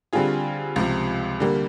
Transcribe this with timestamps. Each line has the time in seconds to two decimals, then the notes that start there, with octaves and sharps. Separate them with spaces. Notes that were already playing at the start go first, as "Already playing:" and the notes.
0.13 D3 G3 C4 F4 G#4
0.76 C#2 C3 F3
1.40 D3 G3 A#3